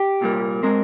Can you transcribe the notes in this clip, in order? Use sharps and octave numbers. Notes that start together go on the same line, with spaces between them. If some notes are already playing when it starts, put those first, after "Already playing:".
Already playing: G4
C2 A#2 G3 A#3
A#2 G#3 C4 A#4